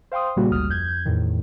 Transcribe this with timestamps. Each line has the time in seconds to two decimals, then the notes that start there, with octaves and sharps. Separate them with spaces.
0.12 C5 F5 G5 C6 D#6
0.36 A#2 C#3 G3 A#3 F#4
0.51 G#1 D2 G3 D#6 F6
0.69 F2 G6 G#6
1.05 E2 A2 D#3